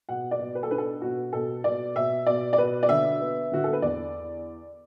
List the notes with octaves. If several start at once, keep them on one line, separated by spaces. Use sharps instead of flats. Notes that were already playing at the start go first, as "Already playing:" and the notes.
B2 F#5
D5
B2
B4
A4
D4 B4
A4
B2 F#4
B2 A4
B2 D5
B2 E5
B2 D5
D5
B2 B4
D5
D3 E5
B3
D3 F#4
A4
B4
E2 D5